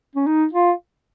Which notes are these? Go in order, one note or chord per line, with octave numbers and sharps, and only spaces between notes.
C#4
D#4
F4